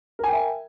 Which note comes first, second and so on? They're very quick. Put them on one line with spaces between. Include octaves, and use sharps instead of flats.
A#4 G#5 G5 E5